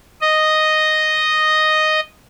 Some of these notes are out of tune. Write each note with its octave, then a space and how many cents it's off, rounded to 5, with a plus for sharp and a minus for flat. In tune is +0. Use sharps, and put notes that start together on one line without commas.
D#5 -5